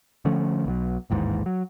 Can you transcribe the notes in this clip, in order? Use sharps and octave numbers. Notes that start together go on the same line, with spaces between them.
D3 F3 A3 C#4
B1 B2 F3 F#3
A1 D#2 G#2 E3
F#3